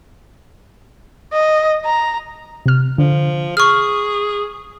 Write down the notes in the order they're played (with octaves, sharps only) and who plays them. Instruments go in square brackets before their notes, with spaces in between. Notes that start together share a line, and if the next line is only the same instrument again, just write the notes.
[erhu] D#5
A#5
[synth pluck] C3 F6
[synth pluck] D3 [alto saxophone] F3
[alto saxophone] G#4 [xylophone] C#6 F6